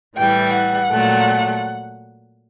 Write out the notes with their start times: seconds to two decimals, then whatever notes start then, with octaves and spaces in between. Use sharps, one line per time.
0.16 A2 E3 G3 G5
0.53 F#5
0.91 A#2 F#3 A3